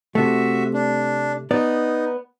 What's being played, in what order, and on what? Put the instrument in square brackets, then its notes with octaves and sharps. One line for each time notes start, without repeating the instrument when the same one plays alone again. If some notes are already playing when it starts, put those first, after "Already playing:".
[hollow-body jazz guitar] C3 A3 [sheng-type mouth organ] F#4 E5
[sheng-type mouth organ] D4
[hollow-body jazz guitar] B3 D5 [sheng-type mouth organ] D#4